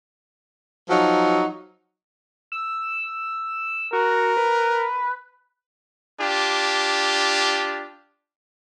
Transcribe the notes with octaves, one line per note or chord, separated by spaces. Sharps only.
F3 F#3 D#4
E6
F#4 A#4
B4
D4 F4 G4